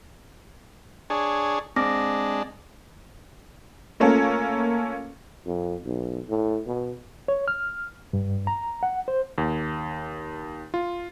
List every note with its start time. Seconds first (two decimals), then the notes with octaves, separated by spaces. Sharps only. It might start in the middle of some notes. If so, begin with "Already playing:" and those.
1.10 D4 G#4 C#5
1.76 G#3 C4 D4 D6 A#6
4.00 A3 A#3 C#4 F4 A4 A#4
5.46 F2
5.85 B1
6.29 A2
6.67 B2
7.28 C#5
7.48 F6
8.13 G2
8.47 A#5
8.83 F#5
9.08 C5
9.38 D#2
10.74 F4